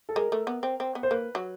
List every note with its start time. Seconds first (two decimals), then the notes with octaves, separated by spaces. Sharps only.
0.09 A4
0.16 G#3 A#4
0.32 A3
0.47 B3
0.63 C4
0.80 C4
0.95 B3
1.03 C5
1.11 A#3 B4
1.35 F#3